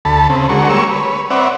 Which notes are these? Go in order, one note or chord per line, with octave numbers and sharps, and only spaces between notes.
D2 A4 A5 B5
C#3 C4
D3 G#3 F#4 A#4 C#6
G3 G#3 A#3 C#5 C#6 E6
B4 C#5
C4 B4 C#5 D5 E5 F#5